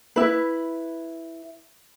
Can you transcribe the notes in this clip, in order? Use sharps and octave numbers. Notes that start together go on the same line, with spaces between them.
E4 B4